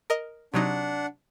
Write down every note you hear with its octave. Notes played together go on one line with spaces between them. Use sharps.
A#4 D#5
C3 F#3 D4 D#4 F#5